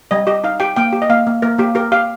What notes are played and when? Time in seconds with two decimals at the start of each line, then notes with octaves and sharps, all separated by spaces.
0.11 G3 D#5
0.27 G4 D#5
0.44 D#4 F5
0.60 G4 G5
0.76 A#3 G5
0.93 G4
1.02 D#5
1.10 A#3 F5
1.27 A#3
1.42 A#3 A#4
1.58 A#3 G4
1.75 G4 A#4
1.92 G4 F5